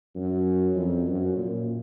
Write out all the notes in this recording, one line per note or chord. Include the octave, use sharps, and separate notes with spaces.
F#2
F2
F#2
A#2